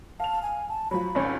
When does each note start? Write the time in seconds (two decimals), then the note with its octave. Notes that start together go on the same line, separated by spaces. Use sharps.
0.20 F5 A5 F7
0.42 G#5
0.69 A5
0.91 F3 F#3 B5
1.15 G#1 C#2 C#4